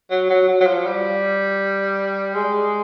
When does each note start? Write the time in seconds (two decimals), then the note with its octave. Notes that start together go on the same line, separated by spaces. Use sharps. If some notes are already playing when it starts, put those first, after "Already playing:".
0.11 F#3
0.30 F#3
0.48 F#3
0.60 F#3
0.66 F3
0.85 G3
2.34 G#3